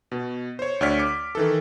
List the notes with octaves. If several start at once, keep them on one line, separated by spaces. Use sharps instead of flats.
B2
C5 C#5
D2 C#5 D5 F6 B6
D6
D#3 E3 A4